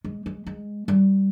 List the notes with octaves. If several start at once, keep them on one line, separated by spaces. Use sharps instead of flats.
G#3
G#3
G#3
G3